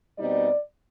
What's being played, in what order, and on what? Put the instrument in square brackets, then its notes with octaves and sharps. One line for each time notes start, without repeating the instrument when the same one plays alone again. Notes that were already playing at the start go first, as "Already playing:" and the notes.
[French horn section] B2 G3 C4 D#4 D5